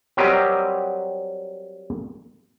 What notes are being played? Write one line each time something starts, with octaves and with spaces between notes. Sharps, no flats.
F#3 G3 C4 G4 A#4 D#5